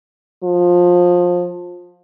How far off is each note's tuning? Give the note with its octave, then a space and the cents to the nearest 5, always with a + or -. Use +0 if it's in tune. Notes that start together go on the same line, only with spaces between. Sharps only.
F3 +20